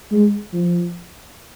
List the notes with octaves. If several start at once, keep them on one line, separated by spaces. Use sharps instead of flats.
G#3
F3